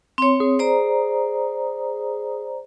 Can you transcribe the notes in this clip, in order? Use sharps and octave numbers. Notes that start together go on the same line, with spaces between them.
C4 C#5 C6
G#4
C5 D5 A#5